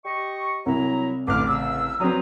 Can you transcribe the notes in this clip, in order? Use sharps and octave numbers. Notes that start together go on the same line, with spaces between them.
G4 D#5 C#6
C2 F#3 E4 A#5
A1 D3 D6 F6
C#3 E6
F#3 G3 C4 B4 A#5 D#6